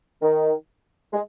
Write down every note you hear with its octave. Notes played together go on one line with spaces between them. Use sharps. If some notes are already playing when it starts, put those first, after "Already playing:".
D#3
G#3